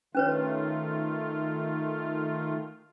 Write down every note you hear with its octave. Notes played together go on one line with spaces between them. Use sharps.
D#3 A3 C#4 F4 B4 C#5